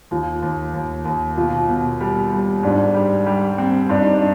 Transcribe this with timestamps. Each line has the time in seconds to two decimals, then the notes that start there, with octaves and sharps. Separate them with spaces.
0.11 D#2 F4
0.43 D#2
0.74 D#2
1.05 D#2
1.37 B2 F4
1.69 B2
2.01 G3
2.32 G3
2.63 G#2 D4
2.94 G3
3.26 G3
3.58 C4
3.89 G2 D4
4.02 D#4
4.14 D4